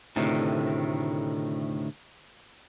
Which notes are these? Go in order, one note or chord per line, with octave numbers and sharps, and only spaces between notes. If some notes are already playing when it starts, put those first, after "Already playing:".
D2 A2 C3 D#3